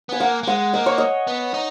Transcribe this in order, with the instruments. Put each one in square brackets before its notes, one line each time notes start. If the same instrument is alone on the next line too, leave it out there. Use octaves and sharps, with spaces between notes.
[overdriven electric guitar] B3 [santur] G#5
[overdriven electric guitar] A#3 [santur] F#5
[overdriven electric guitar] A#3
[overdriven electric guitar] G#3 [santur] F#5
[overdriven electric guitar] A#3 [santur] D#5
[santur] C#5
D#5
[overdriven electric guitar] B3
D#4